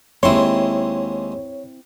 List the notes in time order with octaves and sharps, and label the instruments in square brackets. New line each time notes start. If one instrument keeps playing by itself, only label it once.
[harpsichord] D#2 G#3 C6 [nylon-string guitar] C4 E4 [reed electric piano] C#5